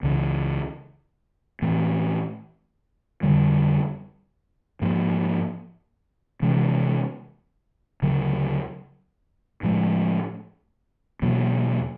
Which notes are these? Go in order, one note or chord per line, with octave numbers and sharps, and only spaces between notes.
C#2 C#3 E3
A2 E3 A3 C4
F2 D3 G3
G#2 F3 A#3
C3 E3 G#3 C#4
D2 C#3 F#3
A2 F3 G#3
E2 B2 F#3 A#3